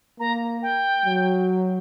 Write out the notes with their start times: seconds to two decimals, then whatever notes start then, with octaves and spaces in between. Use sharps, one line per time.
0.20 A#3 A#5
0.62 G5
1.06 F#3